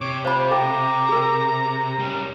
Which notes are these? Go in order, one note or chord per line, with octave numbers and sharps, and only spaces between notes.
C3 C#5 D6
F4 G4 C5 B5
A4 G5 A#5 D6
G#4 A#4
G3 C#4